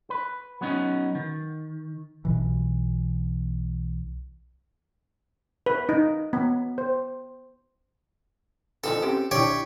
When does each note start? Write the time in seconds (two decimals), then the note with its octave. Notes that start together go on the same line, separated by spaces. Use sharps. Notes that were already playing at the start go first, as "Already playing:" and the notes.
0.10 B4
0.61 F#3 B3 C#4 D#4
1.15 D#3
2.25 B1 B2 E3
5.66 B4
5.89 D#4
6.33 B3
6.78 C5
8.84 E3 F3 D#4 A4
9.02 C4 C#4 G4
9.31 D4 E4 G4 C#5 D5